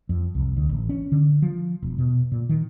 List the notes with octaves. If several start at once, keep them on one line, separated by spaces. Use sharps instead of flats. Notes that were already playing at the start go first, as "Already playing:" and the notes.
F2
C2
D2
A1
C#4
D3
F3
E1
B2
A#2
D#3